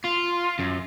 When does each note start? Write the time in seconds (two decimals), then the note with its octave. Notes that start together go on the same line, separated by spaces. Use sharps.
0.05 F4
0.60 F#2